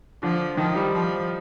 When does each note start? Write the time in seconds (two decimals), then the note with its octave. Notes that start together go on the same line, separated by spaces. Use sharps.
0.22 D3 F3
0.57 D#3 F3
0.76 G3
0.93 F3